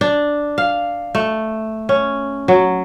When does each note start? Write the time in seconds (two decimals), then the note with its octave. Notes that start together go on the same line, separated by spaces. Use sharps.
0.01 D4
0.58 F5
1.15 A3
1.89 C#4
2.48 F#3